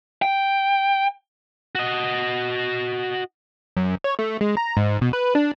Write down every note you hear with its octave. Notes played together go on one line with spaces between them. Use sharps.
G5
F#4 D#5
F#2
C#5
A3
G#3
A#5
G#2
B2
B4
D4